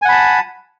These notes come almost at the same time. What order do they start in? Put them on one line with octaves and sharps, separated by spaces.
G#5 F#5 B5 A5